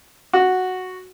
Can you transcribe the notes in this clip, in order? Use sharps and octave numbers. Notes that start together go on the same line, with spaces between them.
F#4